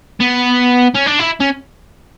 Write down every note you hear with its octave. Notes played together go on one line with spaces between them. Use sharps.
B3
C#4
D4
E4
C#4